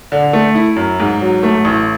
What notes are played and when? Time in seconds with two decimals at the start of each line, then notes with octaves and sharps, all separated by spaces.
0.12 D3
0.33 A3
0.55 E4
0.76 F#2
1.00 G#2
1.21 F#3
1.43 A3
1.65 A1